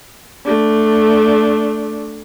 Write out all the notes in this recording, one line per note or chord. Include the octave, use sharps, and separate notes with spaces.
A3 D4